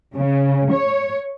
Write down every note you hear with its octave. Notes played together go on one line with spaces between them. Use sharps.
C#3
C#5